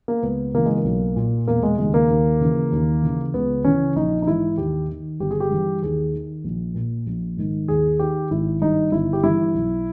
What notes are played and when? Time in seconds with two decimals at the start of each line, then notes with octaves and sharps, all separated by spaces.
0.08 A#3
0.23 C#2 B3
0.54 C#3 E3 A#3
0.65 G#3
0.76 A#3
0.85 B1
1.16 A#2
1.47 E1 A#3
1.63 G#3
1.78 D#2 C#3 G#3
1.94 A#3
2.09 D#2
2.41 C#3 E3
2.72 D#2
3.02 C#3 E3
3.34 C#2 B3
3.64 C#3 E3 C#4
3.96 A#1 D#4
4.22 D#4
4.26 G#2 E3 E4
4.58 D#2 G4
4.89 D#3
5.20 G1 G4
5.31 G#4
5.40 G4
5.50 G2 E3
5.82 D#2 G#4
6.13 D#3
6.44 A#1
6.75 A#2
7.06 A#1
7.37 G#2 D#3
7.68 D#2 G#4
7.99 D#3 G4
8.31 G#1 E4
8.61 G2 D#3 D#4
8.92 G1 E4
9.13 G4
9.23 G2 E3 E4
9.54 B1